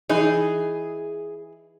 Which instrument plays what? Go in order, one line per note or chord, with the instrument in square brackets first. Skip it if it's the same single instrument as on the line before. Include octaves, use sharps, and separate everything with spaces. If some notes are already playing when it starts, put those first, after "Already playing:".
[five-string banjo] E3 D#4 [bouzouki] G#4